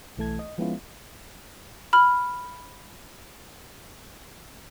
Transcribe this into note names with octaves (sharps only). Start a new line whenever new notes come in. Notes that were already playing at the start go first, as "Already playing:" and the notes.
B1 E3 A3 A5 G#6
D#5
F3 G#3 B3 C#4 E4 F4
B5 F6